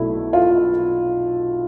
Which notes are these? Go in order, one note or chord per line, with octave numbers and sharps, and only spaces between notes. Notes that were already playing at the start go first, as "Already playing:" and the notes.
Already playing: B1 B2 A3 D4 E4
F4